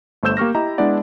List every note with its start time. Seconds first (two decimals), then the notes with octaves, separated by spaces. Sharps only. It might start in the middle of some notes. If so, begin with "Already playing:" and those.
0.23 G1 A3 C5 E6 G6 E7
0.37 A#3 G4 C#6 F6 A#6
0.55 E4 G4 D#5 A#5
0.78 G#3 B3 D4 E4 D5 F#5